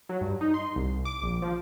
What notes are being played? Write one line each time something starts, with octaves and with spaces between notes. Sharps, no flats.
F#3
G2
D#4
C6
C2
D6
A#1
F3